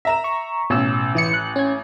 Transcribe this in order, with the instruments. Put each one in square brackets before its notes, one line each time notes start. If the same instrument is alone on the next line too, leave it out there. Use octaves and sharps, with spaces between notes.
[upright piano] E5 A#5 E7
[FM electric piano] C#6
[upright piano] A1 [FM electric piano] B2 C#4 E6
[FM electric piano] E3 E4 C#7
F#6
C#4 G#6